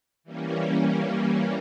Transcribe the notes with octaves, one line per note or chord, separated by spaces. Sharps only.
E3 G3 A#3 C#4